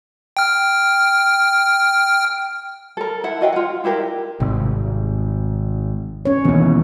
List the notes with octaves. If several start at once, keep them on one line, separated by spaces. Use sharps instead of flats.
G5 F6
A4 A#4
E4 E5 F#5
F#4 D#5 F5 G5
F4 F#5
D4 E4 G4 A#4
G#1 C3
C#4 C#5
D#2 B2 E3